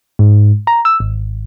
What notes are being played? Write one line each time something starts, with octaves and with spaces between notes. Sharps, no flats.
G#2
A#5
E6
G#1